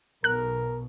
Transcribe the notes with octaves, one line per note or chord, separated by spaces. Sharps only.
B1 B2 A#4 F#6